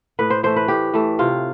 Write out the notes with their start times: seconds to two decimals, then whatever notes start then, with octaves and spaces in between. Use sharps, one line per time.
0.19 A2 B4
0.30 C5
0.43 E3 A3 C5
0.56 B4
0.68 A2 G4
0.94 E3 A3
1.19 C3 F4